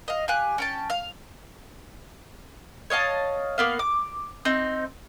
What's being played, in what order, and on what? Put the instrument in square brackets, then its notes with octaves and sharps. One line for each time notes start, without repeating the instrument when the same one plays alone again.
[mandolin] D#5 F5
G4 F5 G#5 F#6
C#4 G5 A5
F5
C#5 D#5 F5 A5
A#3 B3 F5
D6
C4 D#4